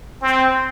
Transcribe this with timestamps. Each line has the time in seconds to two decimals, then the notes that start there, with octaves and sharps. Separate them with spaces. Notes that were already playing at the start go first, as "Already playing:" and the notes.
0.21 C4